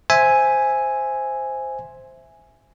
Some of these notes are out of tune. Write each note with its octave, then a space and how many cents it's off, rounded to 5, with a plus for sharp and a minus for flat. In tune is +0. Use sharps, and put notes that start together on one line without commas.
C5 +0 E5 +0 G#5 +0